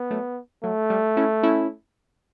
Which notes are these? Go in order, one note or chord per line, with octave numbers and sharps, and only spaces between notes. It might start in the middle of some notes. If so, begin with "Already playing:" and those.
Already playing: B3
F#3 A3
F#3 A3
G3
C#4 E4
C#4 E4